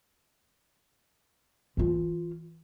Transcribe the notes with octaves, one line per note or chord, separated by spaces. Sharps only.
E3 F4